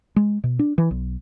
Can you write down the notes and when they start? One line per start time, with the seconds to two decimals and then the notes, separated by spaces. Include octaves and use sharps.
0.16 G#3
0.44 B2
0.59 D4
0.78 E3
0.91 B1